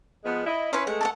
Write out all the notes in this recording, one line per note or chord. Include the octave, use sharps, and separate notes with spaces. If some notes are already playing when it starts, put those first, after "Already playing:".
F3 G#3 B3
E4 D#5
C#4 E4 B4 C6
G#3 A3 F#5
A4 D5 F#5